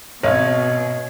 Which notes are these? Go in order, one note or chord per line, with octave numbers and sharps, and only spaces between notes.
G#1 B2 C#5 D#5